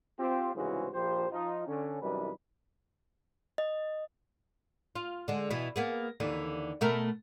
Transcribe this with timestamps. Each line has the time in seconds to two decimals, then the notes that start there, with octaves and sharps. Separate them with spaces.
0.19 C4 F4 G4
0.54 C2 G#2 C#3 E3 F#4 C5
0.93 A#1 F3 G4 C5
1.30 F3 D#4 F4
1.66 D3 C#4
2.01 C2 F#2 E3 G3 D#4 B4
3.58 D#5
4.95 F4
5.28 D3 G#3
5.51 B2 E3
5.76 A#3 B3 G#4
6.20 D#2 D3 E3
6.81 B2 A3 A#4